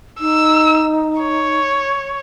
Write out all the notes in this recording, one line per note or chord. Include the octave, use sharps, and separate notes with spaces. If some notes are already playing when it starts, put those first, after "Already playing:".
D#4 E6
C#5